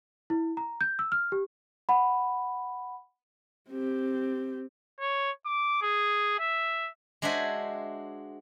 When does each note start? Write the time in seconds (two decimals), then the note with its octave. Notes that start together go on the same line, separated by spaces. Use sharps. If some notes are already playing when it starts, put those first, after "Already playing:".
0.30 E4
0.57 A#5
0.81 G6
0.99 E6
1.12 F6
1.32 G4
1.89 F#5 B5
3.70 C4 G4
5.00 C#5
5.45 D6
5.82 G#4
6.39 E5
7.22 G#3 D4 F#4 C5 E5 G#5